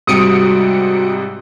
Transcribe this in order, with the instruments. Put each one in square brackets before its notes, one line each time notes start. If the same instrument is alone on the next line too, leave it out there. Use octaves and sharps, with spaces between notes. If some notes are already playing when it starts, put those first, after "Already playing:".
[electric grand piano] G#2 C3 G3 [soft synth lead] F#4 [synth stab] D#6 C#7 D7